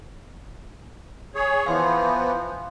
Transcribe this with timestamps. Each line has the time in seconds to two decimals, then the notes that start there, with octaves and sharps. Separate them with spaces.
1.35 G#4 C#5
1.66 E3 F3 B3 F5 C6